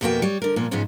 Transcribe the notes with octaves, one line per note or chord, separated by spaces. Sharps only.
F2 B2 A#3 B3 F#4 G5
G3 C#5
D3 A#4
A#2 F3 A#3 B3
G#2 C#3 F3 G#3 B3 C#4